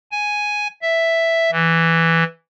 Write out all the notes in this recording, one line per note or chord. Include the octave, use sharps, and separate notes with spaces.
G#5
E5
E3